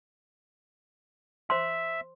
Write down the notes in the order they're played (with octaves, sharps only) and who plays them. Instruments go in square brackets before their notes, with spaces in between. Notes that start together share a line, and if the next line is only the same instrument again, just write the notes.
[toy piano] C5 C6 [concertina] E5